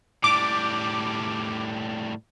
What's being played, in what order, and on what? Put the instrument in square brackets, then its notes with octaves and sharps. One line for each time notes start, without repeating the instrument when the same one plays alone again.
[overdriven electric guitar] A2 G3 [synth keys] D6